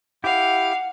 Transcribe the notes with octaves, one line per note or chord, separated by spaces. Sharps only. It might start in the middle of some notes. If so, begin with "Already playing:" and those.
E4 G4 F5 F#5